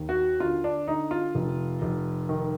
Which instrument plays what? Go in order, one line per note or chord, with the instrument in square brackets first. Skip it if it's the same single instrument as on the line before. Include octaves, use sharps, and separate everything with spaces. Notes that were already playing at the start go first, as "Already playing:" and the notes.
Already playing: [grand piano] D#2
F#4
D3 F4
D4
D3 D#4
F4
F1
F1
D#3